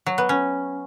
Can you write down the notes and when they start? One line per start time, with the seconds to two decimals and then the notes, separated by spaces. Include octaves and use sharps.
0.06 F#3
0.18 B3
0.29 C#4